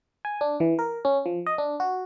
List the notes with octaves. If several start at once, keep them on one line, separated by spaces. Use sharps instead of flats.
G#5
D4
E3
A#4
C#4
F3
D#5
D4
F#4